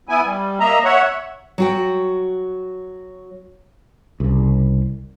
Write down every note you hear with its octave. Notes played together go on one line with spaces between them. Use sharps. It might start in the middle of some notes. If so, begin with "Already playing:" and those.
B3 E4 G#5
G3
A#3 D#5 E5 A#5
C#5 E5 F#5
F#3 F#4 G5
C2 C#3